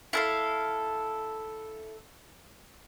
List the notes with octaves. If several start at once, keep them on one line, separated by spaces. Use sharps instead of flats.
E4 A4 F5